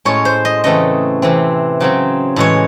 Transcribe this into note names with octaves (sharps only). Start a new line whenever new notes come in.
A2 G#3 C#4 C#5
C5
D#5
C#3 E3 A3 C4 D#5
C3 E3 C4
C#3 F#3 C4
A2 E3 G#3 C#4 C#5